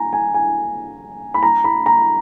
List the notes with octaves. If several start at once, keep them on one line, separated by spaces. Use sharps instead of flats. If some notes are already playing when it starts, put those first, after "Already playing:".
Already playing: G#5 A#5
G#5
G#5
B5
A#5
B5
A#5